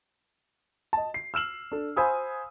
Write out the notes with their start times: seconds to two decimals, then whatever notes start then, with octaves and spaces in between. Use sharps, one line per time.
0.93 D#5 A5
1.14 C7
1.34 E6 F6 E7 F#7
1.72 D4 A4
1.97 C5 F5 G#5 B5 D#6 E6